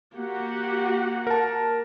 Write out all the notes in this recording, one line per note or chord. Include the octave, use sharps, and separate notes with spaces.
A#3 F#4 G4 F#5
A#4 A5